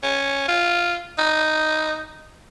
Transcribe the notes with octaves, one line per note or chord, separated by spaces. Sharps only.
C#4
F4
D#4